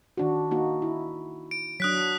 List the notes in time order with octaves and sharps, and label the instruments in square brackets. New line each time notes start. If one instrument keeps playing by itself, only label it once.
[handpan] D#3 D4 F#4
A#3 D#4 F#4
E4
[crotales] D7
[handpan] F#3 D4 [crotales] D#6 F#6 B6